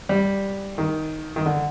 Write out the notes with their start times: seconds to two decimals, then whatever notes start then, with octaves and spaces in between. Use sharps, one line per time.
0.09 G3
0.78 D#3
1.36 D#3
1.46 D3